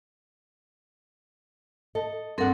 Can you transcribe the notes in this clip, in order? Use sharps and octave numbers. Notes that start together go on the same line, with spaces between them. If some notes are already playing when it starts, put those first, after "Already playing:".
A4 D#5
G2 C4 A4 A#4 F#5